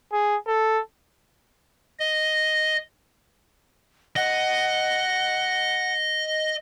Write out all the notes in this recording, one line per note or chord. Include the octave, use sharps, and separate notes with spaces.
G#4
A4
D#5
D#5 F#5